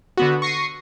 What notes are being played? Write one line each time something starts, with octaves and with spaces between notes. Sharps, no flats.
D3 B3 F#4
C#6 A#6 C7 C#7 D#7